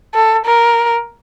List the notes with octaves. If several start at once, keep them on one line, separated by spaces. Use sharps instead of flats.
A4
A#4